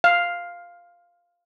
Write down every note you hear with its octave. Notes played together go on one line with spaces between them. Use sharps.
F5